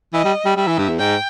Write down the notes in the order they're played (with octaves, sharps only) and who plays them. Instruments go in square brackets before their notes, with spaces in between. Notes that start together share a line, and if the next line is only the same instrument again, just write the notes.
[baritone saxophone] E3 [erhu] D#5
[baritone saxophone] G3
G3
[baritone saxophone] G3 [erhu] E5
[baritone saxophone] E3
G2
E2
[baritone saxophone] G#2 [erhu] G5